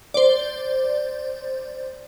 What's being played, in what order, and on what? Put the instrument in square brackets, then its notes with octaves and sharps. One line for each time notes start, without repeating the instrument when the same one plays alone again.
[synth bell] C5 D5